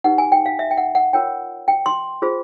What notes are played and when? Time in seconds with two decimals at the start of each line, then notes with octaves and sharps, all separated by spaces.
0.04 D#4 G4 B4 F#5
0.18 G#5
0.32 G5
0.46 F5
0.59 E5
0.71 G5
0.77 F#5
0.95 F#5
1.13 F4 A#4 C#5 G5
1.68 G5
1.86 C6
2.22 F4 G#4 C5